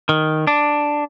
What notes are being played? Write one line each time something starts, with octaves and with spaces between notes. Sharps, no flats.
D#3
D4